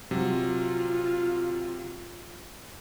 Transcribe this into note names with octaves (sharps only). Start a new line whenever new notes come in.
C3 F#3 F4